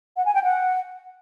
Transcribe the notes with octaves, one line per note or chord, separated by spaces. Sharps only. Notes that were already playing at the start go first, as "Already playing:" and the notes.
F#5
G#5
G5
F#5